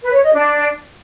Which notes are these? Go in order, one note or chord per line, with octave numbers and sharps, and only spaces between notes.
B4
C#5
D#5
D4